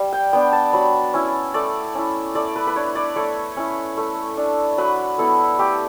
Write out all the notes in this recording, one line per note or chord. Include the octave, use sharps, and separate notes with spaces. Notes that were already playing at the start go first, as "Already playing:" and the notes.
Already playing: G3
G5
B3 D4 G5
A5
F#3 B5
C#4 E4
A3 D5
C#4 E4
A3 D5
B4
B4
D4 C#5
D5
A3 C#5
C#4 E4
A3
D4
F#3 B4
B3 E4 A4
A3 G4